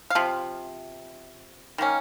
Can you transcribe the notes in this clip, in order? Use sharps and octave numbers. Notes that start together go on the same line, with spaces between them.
F5
C3 F3
D#3 A#3 C#4